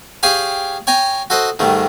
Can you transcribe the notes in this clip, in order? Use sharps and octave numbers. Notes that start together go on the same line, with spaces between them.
G4 G#4 C#5 F5 G5 G#5
C#5 G5 G#5 A#5
F#4 A4 C5 D#5 F#5
G#2 D#3 G3 A3